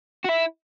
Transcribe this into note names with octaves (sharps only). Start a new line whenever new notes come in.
F#4
E4